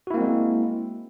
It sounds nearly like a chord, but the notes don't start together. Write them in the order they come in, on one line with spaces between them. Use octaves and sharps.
F#4 E4 A#3 C4 G#3